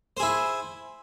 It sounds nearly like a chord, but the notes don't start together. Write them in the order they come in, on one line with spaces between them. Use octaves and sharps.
C5 G#4 E4